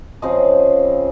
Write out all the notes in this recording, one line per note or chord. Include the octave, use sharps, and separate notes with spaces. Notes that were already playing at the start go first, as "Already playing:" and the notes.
C#3 F3 C4 D#5